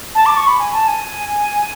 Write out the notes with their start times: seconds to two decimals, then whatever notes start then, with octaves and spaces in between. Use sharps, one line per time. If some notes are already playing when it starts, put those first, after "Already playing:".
0.15 A5
0.26 D6
0.37 C#6
0.47 B5
0.59 G#5
0.73 A5
0.88 G#5